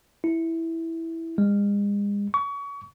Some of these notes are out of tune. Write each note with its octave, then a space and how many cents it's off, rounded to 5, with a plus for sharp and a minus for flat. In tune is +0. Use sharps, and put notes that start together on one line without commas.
E4 -5
G#3 -40
C#6 +30